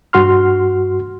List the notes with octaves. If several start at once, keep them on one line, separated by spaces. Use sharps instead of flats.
G2 F#4 C6 F6